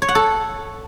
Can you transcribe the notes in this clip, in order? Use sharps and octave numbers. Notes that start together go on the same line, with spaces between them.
C#5
F#5
A4